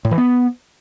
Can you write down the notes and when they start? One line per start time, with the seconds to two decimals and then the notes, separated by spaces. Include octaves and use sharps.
0.05 A2
0.11 E3
0.18 B3